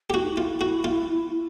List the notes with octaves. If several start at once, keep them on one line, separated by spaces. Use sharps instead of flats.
G4
E4 F#4
D#4
E4
F4
F#4
F4